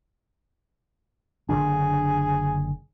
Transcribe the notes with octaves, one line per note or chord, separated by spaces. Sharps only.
F#1 D3 D4 G#4